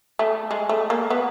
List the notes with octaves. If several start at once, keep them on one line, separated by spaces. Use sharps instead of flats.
A3
G#3
A3
A#3
B3